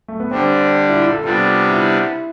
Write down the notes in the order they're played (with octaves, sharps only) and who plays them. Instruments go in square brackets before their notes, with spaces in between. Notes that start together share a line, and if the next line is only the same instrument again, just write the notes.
[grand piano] A3
B3
[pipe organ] D3 G3 D4 [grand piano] C4
[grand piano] E4
F4
A4
[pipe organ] C3 G3 B3 D4 [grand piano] F4
[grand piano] E4